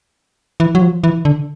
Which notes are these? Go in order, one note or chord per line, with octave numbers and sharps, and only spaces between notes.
E3
F#3
F3
E3
D3